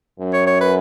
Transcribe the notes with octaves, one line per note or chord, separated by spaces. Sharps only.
F#2
C#5
C#5
B4